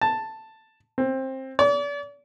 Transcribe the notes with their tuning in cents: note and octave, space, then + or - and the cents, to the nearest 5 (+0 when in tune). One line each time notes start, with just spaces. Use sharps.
A5 +5
C4 +20
D5 -40